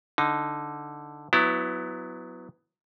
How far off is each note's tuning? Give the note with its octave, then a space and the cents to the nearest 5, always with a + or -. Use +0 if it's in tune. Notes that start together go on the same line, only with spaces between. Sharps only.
D3 +0 D#4 +0
F#3 -5 B3 +15 E4 +0